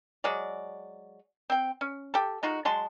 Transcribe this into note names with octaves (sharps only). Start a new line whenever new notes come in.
F#3 G#3 G#4 D5
C4 G5
C#4
G4 A4
G#3 D#4 F4 F#4
F#3 G#3 A5 C6